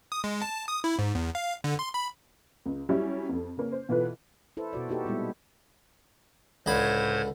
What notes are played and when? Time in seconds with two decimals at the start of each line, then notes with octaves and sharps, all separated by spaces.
0.12 D#6
0.24 G#3
0.42 A5
0.68 D#6
0.84 E4
0.99 G#2
1.15 E2
1.35 F5
1.64 D3
1.79 C6
1.94 B5
2.66 C#2
2.89 F#3 G3 C#4 E4 G4
3.29 F2 A4
3.57 C#3 A#3 C#4
3.72 C5
3.89 B2 E3 F4 A4 B4
4.57 E4 A4 B4 C5
4.73 B2 F#4 D5
4.88 A#3 B3 D#4 F#4 G4 A4
5.05 A#2 G3 G#3 B3 E4
6.66 C#2 A2 D3 C5 B5 G#6